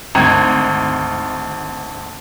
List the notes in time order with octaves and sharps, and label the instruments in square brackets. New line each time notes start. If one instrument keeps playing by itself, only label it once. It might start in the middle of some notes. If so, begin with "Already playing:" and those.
[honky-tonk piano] G#1 D2 G#6